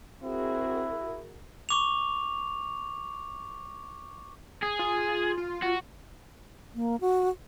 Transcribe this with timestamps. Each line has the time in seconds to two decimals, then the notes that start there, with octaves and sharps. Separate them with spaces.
0.22 C4 E4 F#4 G#4 A#4
1.69 C#6 D6 F7
4.63 G#4
4.79 F4
5.38 F4
5.62 F#4
6.75 A#3
7.01 F#4